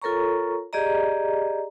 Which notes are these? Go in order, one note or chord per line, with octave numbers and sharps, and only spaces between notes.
F4 A4 A#4 C#5 A#5 C#6
G4 G#4 D5 D#5 A#5